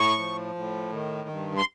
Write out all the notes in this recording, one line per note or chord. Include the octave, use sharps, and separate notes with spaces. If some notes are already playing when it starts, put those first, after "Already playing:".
Already playing: A2 C#6
F3
A2
D#3
G2
C6